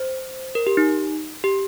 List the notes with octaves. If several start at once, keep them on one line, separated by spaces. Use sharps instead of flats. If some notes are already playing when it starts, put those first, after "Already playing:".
Already playing: C5
A#4
G4
D#4
G4